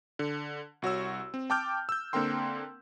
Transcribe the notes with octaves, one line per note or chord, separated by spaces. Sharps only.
D3
C2 F#4 C#5 E6
C4
G5 A5 D6 F6 G6
E6 G6
D3 A#3 C4 A#4 G5 C6